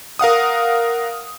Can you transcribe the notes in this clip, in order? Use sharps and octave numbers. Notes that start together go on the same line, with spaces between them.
A#4 F5 F#5 D#6